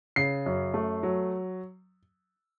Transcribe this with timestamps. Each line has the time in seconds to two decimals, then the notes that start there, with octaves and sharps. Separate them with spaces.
0.16 C#3 C7
0.46 F#2
0.74 A3
1.03 F#3